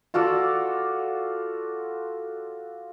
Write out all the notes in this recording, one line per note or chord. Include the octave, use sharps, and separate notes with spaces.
F4 F#4 A4 D5